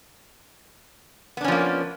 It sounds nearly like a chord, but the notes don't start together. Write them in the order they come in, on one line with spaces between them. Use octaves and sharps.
B3 D4 C#4 F3 A#3